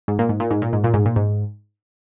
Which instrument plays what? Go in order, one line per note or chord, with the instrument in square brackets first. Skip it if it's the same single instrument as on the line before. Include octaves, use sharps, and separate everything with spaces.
[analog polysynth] G#2
A#2
G#2
A#2
G#2
A#2
G#2
A#2
G#2
A#2
G#2